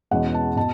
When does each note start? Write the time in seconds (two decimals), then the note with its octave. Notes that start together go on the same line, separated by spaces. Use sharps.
0.11 E2 B2 G#3 C#4 F#5
0.34 A5
0.56 B2 A5